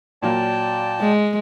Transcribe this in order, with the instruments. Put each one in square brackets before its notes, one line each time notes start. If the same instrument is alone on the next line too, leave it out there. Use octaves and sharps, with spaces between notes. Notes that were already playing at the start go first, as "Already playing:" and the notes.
[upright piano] A#2 F#3 A#3 [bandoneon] D5 G5 A5
[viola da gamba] G#3